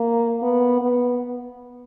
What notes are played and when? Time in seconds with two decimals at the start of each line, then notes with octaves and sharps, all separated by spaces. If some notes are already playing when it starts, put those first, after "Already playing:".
Already playing: A#3
0.42 B3
0.82 B3